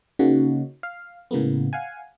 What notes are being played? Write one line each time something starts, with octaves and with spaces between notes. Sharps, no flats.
C#3 A#3 C#4 D#4 F#4
F5
A2 C#3 G#3 A#3 B3
F5 F#5 G#5